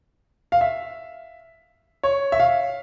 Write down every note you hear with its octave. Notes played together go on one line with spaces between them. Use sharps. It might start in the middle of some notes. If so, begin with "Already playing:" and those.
F5
E5
C#5
E5
F5